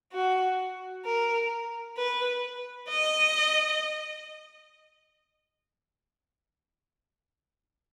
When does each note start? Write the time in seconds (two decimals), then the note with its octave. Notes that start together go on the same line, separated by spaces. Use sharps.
0.12 F#4
1.05 A#4
1.98 B4
2.90 D#5